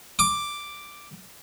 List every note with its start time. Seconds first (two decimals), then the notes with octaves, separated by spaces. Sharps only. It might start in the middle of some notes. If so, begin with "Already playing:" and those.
0.19 D6